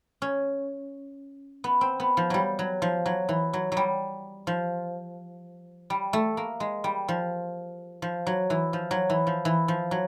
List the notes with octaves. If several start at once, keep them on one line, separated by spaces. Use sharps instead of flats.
C#4
B3
C4
B3
F3
F#3 G3
F#3
F3
F#3
E3
F#3
F#3
G3
F3
G3
A3
A#3
G#3
G3
F3
F3
F#3
E3
F3
F#3
E3
F3
E3
F3
F#3